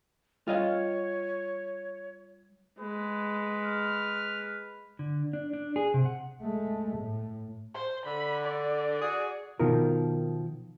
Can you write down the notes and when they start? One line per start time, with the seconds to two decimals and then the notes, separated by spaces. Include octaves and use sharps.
0.48 G3 F4 C#5 D#5 F5
2.80 G#3 B4
3.65 F6
4.99 D3
5.33 D4
5.53 D4
5.76 G#4
5.94 C3
6.05 F#5
6.41 G#3 A3
6.98 A2
7.74 C5
8.05 D3 B5
8.44 D5
9.02 F#4 G#4
9.59 B2 D#3 F3 A#4